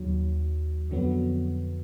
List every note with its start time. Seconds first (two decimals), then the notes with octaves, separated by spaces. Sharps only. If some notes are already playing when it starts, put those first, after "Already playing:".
Already playing: D#2 D#3 F#3
0.90 F2 D3 F#3 B3